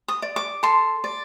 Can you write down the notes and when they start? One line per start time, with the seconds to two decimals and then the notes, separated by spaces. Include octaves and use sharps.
0.08 D#6
0.22 D5
0.36 D6
0.63 A4 C6
1.04 D5